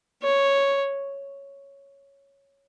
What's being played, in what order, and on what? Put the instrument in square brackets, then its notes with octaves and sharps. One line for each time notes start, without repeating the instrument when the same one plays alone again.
[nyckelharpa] C#5